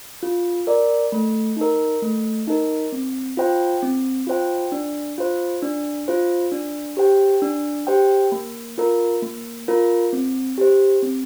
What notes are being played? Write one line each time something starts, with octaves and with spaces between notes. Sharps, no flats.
F4
A#4 D5
A3
D#4 A#4
A3
D#4 A#4
C4
F4 C5 G5
C4
F4 C5 G5
D4
F4 C5
D4
F4 C5
D4
G4 C5 G5
D4
G4 C5 G5
A#3
F4 A#4
A#3
F4 A#4
C4
G4 C5
C4